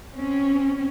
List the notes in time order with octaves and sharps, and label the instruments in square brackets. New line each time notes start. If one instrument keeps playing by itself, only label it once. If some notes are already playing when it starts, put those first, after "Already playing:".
[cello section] C4 C#4